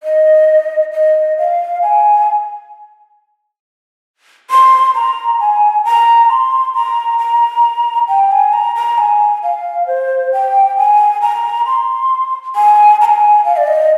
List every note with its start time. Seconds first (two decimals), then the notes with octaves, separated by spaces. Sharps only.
0.03 D#5
0.93 D#5
1.38 F5
1.82 G#5
4.50 C6
4.95 A#5
5.40 G#5
5.85 A#5
6.29 C6
6.75 A#5
7.19 A#5
8.08 G5
8.31 G#5
8.53 A#5
8.75 A#5
8.98 G#5
9.43 F5
9.87 C5
10.33 G5
10.77 G#5
11.22 A#5
11.66 C6
12.56 G#5
13.01 A#5
13.05 G#5
13.45 F5
13.57 D5
13.67 D#5